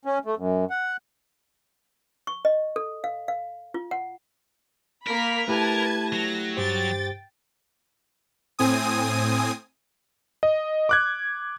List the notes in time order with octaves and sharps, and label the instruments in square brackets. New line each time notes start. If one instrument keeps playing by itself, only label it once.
[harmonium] C#4
A3
F#2
F#5
[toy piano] C#6
D#5
A4
F5
F5
F4
F#5
[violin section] A#3 B5 B6 [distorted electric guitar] A#4
[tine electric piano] A3 E4 G4 [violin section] B4 A5 G#6
[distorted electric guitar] F#3 [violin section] A#6
[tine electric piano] G2 G4 C5 [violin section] G5 A6
[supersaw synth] A2 C4 G#5 D#6
[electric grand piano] D#5
D6 F#6 G#6